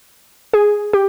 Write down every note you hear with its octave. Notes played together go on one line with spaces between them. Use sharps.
G#4
G4